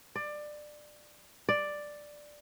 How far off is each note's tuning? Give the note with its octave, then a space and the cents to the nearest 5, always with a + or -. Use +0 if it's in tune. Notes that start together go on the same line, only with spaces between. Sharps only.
D5 +20
D5 +5